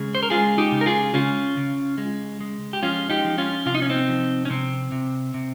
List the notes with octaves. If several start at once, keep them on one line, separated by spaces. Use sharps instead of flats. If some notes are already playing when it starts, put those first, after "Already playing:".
Already playing: C#3 G#3 G#4
C5
A#4
G#3 F4 G#4
D#4 G4
C#3
A#4
F4 G#4
C#3 C#4 F4
C#3
G#3
G#3
G4
F3 C#4 F4
D#4 G4
F3
C#4 F4
C3 F4
D#4
C#4
C4 D#4
F3
C#4
C3 C4
C3
C3